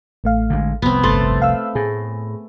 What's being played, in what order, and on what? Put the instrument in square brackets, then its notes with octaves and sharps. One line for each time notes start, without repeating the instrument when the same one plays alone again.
[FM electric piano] A1 A3 F5
[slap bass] D3 D#3 G#3
[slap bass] F1 C2 [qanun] B3 C4
[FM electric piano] G1 C6 A6 [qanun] A3
[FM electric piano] F5 E6
[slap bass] A2 [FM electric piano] G#4